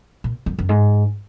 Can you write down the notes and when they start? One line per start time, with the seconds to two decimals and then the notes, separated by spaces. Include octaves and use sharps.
0.24 A#2
0.46 F#2
0.59 F#2
0.69 G#2